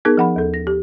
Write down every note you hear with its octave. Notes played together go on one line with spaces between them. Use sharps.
B3 D#4 G#4 A#4 G#6
F3 F#5 B5
D#2 A4
A#6
G4